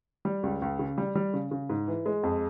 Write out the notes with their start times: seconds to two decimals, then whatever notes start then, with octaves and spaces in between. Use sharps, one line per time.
0.25 G3
0.43 C#2
0.62 C#2
0.79 C#3
0.98 G3
1.15 G3
1.34 C#3
1.51 C#3
1.70 G#2
1.88 E3
2.06 G#3
2.23 F2